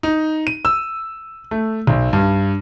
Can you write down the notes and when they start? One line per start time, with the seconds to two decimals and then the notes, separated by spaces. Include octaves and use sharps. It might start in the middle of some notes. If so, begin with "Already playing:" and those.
0.03 D#4
0.47 D#7
0.65 E6
1.51 A3
1.87 B1
2.13 G2